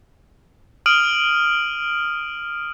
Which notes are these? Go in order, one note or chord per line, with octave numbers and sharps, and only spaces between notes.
D#6 F6 D7 D#7 F#7